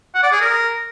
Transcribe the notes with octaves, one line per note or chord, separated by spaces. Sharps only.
F#5
D5
G#4
A#4